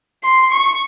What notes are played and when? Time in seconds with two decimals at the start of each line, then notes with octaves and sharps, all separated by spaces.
0.23 C6
0.52 C#6